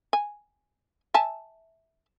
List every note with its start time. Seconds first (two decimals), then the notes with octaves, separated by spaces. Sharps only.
0.13 G#5
1.14 E5 G#5 A5